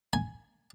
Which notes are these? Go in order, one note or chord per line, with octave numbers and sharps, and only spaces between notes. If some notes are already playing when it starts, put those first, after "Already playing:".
G#5